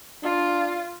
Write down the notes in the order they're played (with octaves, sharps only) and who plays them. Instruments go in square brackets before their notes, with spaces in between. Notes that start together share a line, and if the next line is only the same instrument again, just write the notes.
[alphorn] D4 [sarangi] F4